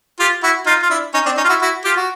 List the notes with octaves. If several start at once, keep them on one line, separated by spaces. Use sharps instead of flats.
F4 G4
E4 F#4
D#4 F4
F4
D4 E4
C#4 D#4
C4 D4
C#4 D#4
F4
E4 F#4
E4 F#4
F4 G4
F#4